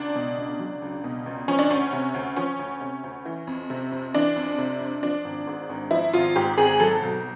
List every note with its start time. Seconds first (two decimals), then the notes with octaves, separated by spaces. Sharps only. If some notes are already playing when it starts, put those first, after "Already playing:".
Already playing: C#2 D4
0.15 B2
0.38 C#2
0.59 F#3
0.82 C#2
1.04 B2
1.26 C#2
1.48 F3 C#4
1.59 D4
1.70 D2 C#4
1.93 C3
2.14 D2
2.36 F3 C#4
2.59 D2
2.81 C3
3.03 D2
3.25 E3
3.47 F2
3.70 C3
3.92 F2
4.14 E3 D4
4.36 F2
4.58 C3
4.80 F2
5.03 F3 D4
5.24 G#1
5.47 G#2
5.69 G#1
5.91 F3 E4
6.13 G#1 F4
6.36 G#2 G4
6.58 G#1 G#4
6.80 F#3 A4
7.02 B1